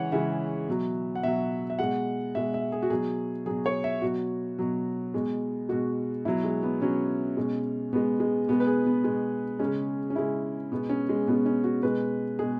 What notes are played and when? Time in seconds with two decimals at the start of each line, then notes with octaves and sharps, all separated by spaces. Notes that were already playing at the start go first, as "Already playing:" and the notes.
Already playing: C#3 E3 G#3 C#5 F#5
0.12 C#3 E3 G#3 E5
0.68 B2 F#3
1.15 F#5
1.23 B2 F#3 E5
1.70 E5
1.79 B2 G#3 F#5
2.35 B2 G#3 E5
2.54 E5
2.72 G#4
2.83 F#4
2.90 B2 F#3 G#4
3.46 B2 F#3 G#4
3.66 C#5
3.84 E5
4.02 B2 F#3 F#4
4.59 B2 F#3
5.14 B2 G#3
5.69 B2 G#3 F#4
6.25 B2 F#3 E4
6.44 G#3
6.63 B3
6.81 B2 F#3 C#4
7.37 B2 G#3
7.93 B2 G#3 B3
8.20 G#3
8.48 B2 G#3 B3
8.60 B4
8.67 G#4
8.86 B3
9.04 B2 G#3
9.59 G#3 C#4
9.65 C#3
10.10 C#4
10.16 C#3 G#3 E4
10.72 B2 G#3 B3
10.90 C#4
11.09 G#3
11.27 B2 G#3 B3
11.46 C#4
11.64 F#4
11.82 B2 G#3 B4
12.39 B2 G#3 G#4